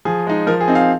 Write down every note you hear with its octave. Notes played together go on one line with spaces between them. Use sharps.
F3 G#4
G#3 D#4
F3 A#4
G#4
C4 D#4
F5